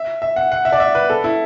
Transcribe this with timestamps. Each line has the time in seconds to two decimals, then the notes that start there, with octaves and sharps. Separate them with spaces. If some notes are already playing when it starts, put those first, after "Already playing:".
Already playing: E5
0.22 E5
0.36 F#5
0.52 F#5
0.65 E5
0.72 D5
0.80 E5
0.95 B4
1.10 A4
1.24 E4